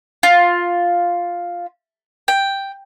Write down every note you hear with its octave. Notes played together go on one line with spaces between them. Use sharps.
F4
G5